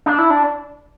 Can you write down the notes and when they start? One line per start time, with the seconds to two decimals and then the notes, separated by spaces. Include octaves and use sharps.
0.06 D4
0.18 E4
0.30 D4